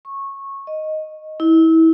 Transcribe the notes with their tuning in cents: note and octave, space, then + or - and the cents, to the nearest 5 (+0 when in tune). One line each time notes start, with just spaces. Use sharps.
C#6 -15
D#5 +0
E4 -30